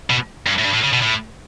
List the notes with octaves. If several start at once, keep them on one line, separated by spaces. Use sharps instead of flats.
B2
G2
A2
G2
A2
C#3
B2
A2